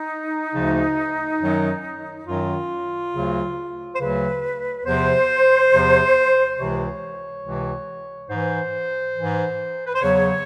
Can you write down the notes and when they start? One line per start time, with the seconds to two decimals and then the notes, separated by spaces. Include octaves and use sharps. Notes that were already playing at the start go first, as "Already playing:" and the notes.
Already playing: D#4
0.54 D2 C#3 F3
1.41 F#2 D#3 F#3
2.27 F#2 D#3 F#3 F4
3.13 D2 C#3 F#3
3.95 C5
3.99 D2 C#3 F#3 B4
4.85 E2 C3 F3 C5
5.72 E2 C3 F3
6.58 C#2 C3 E3 C#5
7.44 C#2 C3 E3
8.30 G#2 E3 C5
9.17 G#2 E3
9.87 B4
9.95 C5
10.02 E2 C#3 F#3 C#5